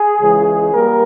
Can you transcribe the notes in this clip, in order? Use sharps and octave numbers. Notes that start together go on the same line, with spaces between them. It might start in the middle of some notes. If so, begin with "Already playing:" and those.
Already playing: G#4
C#2 C#3 E3 G#3
G3 A#3 A#4